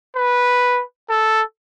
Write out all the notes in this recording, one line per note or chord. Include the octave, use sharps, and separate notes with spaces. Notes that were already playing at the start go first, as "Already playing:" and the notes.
B4
A4